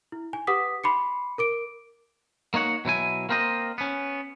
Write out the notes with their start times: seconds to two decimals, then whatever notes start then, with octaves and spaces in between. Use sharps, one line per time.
0.12 E4
0.33 G#5
0.47 G4 B4 F#5 D6 D#6 B6
0.84 B5 C6 D6 C7 C#7
1.38 A#4 D6 D7
2.54 A#3 D#4 C#5 F#5
2.85 B2 F#3 E4 G#5
3.29 A#3 C4 A#4 C5 D#5
3.78 B3 C#4